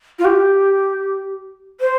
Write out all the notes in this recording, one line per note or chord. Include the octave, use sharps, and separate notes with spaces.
F4
G4
C5